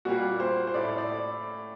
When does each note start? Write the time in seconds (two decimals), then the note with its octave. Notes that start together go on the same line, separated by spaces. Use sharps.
0.05 A#2 G3 A#3 F#4
0.40 C5
0.67 C5
0.74 A2 A3 D5
0.98 D5